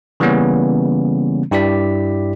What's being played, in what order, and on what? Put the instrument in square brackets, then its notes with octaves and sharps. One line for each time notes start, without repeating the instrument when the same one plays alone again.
[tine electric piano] C#3 E3 G3 A#3 B3 C#4
G2 E4 G4 D5 B6